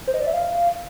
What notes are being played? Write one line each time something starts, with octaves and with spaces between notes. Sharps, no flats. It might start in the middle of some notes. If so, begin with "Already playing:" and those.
C5
D#5
D5
E5
F5